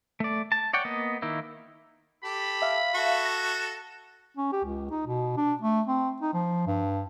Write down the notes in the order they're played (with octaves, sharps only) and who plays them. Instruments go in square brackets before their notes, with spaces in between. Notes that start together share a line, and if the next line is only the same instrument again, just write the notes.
[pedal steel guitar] A3 D5
A5
C#5 D5 F#5 G5
A#3 B3 D#5
D#3 A#3 D#4 E4
[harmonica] G4 A4 [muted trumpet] B5
[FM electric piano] E5 F5
[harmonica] F#4 A4
[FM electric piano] A#6
[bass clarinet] C#4
G4
C#2
D#4
B2
D4
A3
C4
D#4
F3
G2